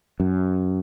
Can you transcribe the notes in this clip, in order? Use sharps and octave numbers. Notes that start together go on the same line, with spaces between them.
F#2